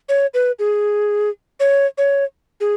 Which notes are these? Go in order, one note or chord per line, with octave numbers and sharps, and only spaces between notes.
C#5
B4
G#4
C#5
C#5
G#4